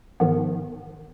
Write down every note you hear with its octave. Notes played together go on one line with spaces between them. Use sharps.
G#2 D#3 F3 B3